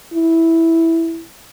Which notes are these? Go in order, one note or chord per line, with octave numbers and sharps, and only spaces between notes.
E4